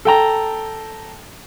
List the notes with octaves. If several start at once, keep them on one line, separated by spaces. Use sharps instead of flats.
A4 G5 A#5